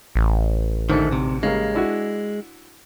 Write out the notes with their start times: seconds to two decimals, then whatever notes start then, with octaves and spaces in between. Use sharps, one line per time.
0.16 A1
0.90 D2 G#2 D3 D#3 A3
1.12 C3
1.43 C#3 G3 G#3 A#3
1.74 D4 E4 F#4